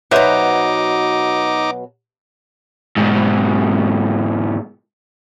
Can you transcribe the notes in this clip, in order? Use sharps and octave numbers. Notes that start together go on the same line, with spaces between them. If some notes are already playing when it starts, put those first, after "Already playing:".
B2 F#3 D#4 B4 C5 E5 D6
G#2 B2